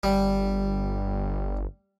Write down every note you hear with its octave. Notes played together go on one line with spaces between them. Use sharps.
G1 G3